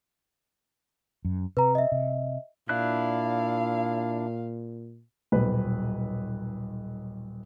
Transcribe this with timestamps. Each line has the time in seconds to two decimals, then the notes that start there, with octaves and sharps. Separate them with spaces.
1.25 F#2
1.57 C3 B4 A#5
1.75 D#5 E5
1.92 C3
2.69 A#2 D4 E4 F5 F#6
5.32 D#1 B1 B4